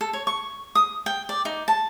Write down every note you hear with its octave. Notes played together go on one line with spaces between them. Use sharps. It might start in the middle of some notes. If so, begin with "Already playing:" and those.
A4
C#5
C#6
D#6
G5
D5
D#4
A5